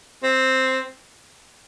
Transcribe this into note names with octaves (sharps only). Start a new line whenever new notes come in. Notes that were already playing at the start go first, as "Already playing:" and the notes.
C4